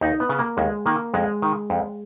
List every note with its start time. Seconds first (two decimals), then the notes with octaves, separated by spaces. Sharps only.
0.01 D#2 D#4
0.20 B3
0.29 C#3
0.39 A#3
0.57 D#2 G#3
0.86 D#3 A#3
1.14 F2 G#3
1.42 D#3
1.70 F2